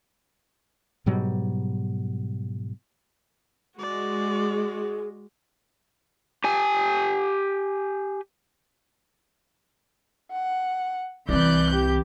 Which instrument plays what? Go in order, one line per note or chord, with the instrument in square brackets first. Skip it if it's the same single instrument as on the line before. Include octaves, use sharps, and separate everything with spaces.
[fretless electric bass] G#2 B2 F#3 G3
[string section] G#3 [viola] F#4 [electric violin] D5
[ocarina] G#4
[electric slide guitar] G4 G#5
[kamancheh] F#5
[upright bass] C2 C4 [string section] E3 G6 [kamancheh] D5 F#6
[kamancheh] G4